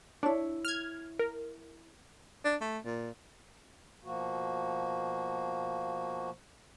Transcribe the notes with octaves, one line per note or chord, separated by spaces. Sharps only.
D4 E4 C#5
F6 G#6
A#4
D4
A3
A#2
B2 F3 A#3 F#4